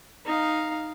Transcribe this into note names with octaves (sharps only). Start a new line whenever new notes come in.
D#4 F5